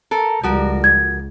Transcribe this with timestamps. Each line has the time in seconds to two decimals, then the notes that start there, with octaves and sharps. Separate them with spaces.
0.11 A4 A#4
0.43 C#2 F3 G3 F#4 A#4
0.84 G#6